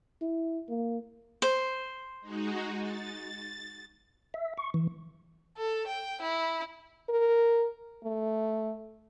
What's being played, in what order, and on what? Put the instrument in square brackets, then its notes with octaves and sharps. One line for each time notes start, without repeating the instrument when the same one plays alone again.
[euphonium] E4
A#3
[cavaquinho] C5
[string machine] G#3 D#4 F#4
A6
[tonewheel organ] E5
C#6
E3
[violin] A4
G5
E4
[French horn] A#4
A3